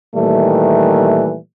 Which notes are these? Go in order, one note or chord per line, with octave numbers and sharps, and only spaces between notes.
A#2 D#3 E3 G3 A3